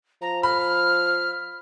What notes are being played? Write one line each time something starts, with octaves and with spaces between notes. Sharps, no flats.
F3 A#5
B5 F6